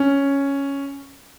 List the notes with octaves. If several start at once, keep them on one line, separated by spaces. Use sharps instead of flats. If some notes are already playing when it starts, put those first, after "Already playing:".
Already playing: C#4